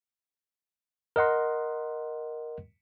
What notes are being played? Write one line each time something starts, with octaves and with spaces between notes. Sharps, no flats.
A#4 D#5 F#5 C6